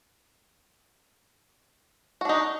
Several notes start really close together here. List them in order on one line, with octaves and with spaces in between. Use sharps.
F#4 D4 D#4